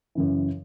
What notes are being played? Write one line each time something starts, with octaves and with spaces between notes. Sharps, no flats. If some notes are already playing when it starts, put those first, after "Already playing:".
F#2 C#3 E3